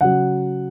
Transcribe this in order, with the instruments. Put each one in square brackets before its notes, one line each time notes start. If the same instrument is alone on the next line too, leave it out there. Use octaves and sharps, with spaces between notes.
[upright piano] C#3 F#3 F#5